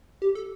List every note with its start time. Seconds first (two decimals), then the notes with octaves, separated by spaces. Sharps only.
0.22 G4
0.35 A4